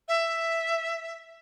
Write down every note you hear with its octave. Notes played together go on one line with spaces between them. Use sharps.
E5